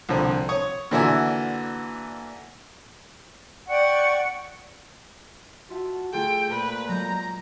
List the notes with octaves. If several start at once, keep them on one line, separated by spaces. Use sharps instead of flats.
C2 D3 F3
C#5 C#6 D#6
A#2 D3 E3 F#4 E5 G#5
D5 F#5 G5 C#6
F4 F#4 E5 A5
A3 F4 G#4 A4 G5
A#2 B4 C5
F#3 G#3 A#5 G6